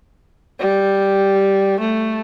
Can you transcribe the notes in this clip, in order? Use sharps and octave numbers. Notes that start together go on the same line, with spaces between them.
G3
A3